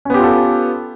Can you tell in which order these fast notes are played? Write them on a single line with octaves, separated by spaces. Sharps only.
C#4 B3 G4 F4 A4